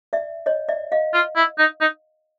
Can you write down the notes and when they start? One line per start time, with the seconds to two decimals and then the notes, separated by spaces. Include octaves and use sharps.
0.13 D5 E5
0.46 C#5 D#5
0.69 D5 E5
0.92 D#5 F5
1.13 F4
1.36 E4
1.58 D#4
1.81 D#4